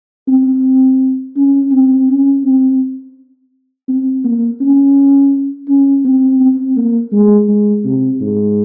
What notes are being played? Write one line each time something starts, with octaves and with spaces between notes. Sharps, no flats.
C4
C#4
C4
C#4
C4
C4
A#3
C#4
C#4
C4
C4
A#3
G#3
G#3
C3
G#2